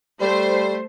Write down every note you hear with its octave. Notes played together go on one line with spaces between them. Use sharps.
G3 A3 C5